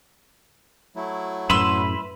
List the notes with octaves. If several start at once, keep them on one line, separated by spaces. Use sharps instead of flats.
F#3 A3 E4
F#2 A2 B4 E5 B5 C6 E6